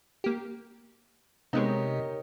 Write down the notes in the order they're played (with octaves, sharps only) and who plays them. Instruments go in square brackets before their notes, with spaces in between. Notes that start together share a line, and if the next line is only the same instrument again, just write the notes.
[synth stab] A#3 G4
[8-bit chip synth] C3 [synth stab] G#3 B3 C4 [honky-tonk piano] D#4 [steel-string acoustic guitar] G4 A#4 C#5